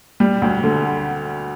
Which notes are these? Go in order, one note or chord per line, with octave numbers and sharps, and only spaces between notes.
G3
D2
D3